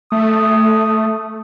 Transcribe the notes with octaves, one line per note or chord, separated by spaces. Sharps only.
A3 D#6